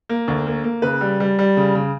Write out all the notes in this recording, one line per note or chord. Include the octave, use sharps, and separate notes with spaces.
A#3
D2
A#3
A#3
C#3 B4
G3
G3
G3
C#3
C#3